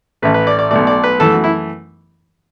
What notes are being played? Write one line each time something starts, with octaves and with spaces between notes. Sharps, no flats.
A1 A2 A3 B4
B4
D5
D5
B1 B2 A3 D5
D5
B4
F#2 E3 A3 A4
F#4
E4